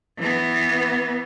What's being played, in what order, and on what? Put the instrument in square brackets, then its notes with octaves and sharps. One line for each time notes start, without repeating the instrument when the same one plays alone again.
[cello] E3 B3